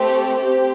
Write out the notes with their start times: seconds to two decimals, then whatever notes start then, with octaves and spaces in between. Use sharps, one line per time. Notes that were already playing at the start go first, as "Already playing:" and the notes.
Already playing: A3 C4 G4
0.38 C4 G4